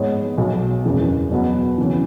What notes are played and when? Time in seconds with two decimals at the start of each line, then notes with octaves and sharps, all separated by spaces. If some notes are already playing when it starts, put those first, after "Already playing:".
Already playing: G#2 G#3 B3 G#4 C#5
0.37 B1 B2 F#3
0.85 F#1 E2 C#3 G#3
1.31 B2 F#3 B3
1.78 C#3 E3 C#4